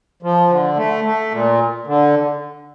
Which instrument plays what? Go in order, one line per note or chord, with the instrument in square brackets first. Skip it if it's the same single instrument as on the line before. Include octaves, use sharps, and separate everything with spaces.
[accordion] F3
D3
A3
A3
A#2
D3